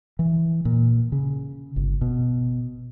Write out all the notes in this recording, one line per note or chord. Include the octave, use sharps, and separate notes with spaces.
E3
A#2
C#3
G1
B2